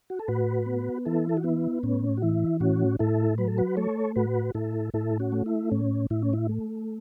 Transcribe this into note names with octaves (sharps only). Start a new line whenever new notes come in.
F#4
A4
A2 F#4 B4
B3
E3 E4 A4
A4
F#4
B3 E4
A2 C#4
F#4
E3 E4
A2 C#4 F#4
A2 E4 A4
F#3 B4
A4
F#4 B4
A3 A4 C#5
A2 F#4 B4
A2 E4 A4
A2 E4 A4
C#4 F#4
A3
E4
A2 C#4
A2 E4
C#4
E4
A3